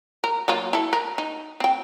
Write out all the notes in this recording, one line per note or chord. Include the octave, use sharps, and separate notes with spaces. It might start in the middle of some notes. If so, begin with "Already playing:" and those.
A#4
F#3 A#3 F4
E4 A4
A#4
D#4
C4 G5